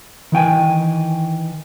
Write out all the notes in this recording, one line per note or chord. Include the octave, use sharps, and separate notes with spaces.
D#3 E3 G5 G#5